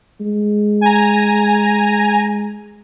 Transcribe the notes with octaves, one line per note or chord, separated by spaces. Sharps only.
G#3
G#5 A#5